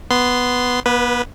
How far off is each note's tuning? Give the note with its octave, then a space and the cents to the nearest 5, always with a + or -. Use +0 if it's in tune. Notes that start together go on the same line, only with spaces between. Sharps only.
B3 +0 C6 -10
B3 -40 B4 +0